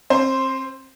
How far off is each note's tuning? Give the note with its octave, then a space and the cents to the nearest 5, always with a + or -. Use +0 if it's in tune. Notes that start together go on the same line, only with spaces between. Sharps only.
C4 +30 C5 +0